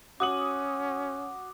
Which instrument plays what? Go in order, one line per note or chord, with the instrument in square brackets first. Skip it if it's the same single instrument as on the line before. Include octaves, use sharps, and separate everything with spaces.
[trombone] C#4 [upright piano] F#4 D#6 F#7 [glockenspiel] D6